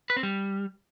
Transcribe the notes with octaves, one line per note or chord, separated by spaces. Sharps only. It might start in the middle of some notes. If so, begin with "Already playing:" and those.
B4
C4
G3